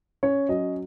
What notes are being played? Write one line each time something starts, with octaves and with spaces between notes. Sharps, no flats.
C#4 C#5
F#3 D#5